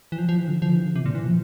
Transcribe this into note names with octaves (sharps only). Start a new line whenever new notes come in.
E3
F3
F3
E3
D3
F3
E3
D3
C3
A#2
E3
F3